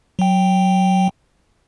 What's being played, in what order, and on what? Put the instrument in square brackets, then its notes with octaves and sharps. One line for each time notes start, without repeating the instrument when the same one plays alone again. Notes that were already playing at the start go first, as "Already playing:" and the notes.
[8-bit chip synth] F#3 G5